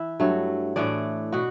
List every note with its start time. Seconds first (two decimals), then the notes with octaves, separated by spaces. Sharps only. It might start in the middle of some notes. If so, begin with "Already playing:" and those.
Already playing: E3 E4 E5
0.20 G2 F#3 A3
0.76 A2 E3 A3 D4 D5
1.32 B2 F#4 F#5